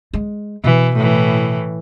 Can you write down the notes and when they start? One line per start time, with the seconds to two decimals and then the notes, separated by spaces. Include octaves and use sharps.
0.13 G#3
0.64 B2 E3
0.96 A2 E3